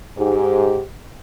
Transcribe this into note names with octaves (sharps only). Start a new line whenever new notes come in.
G#2 G4